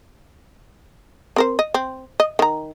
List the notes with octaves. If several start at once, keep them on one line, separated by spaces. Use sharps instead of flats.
C4 A#4 C5
D#5
C4
D#5
D#3 A#5